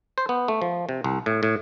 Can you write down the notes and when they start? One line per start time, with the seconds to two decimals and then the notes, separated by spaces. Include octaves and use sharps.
0.18 C5
0.29 B3
0.48 A3
0.62 F3
0.89 C3
1.04 C2
1.26 A2
1.43 A2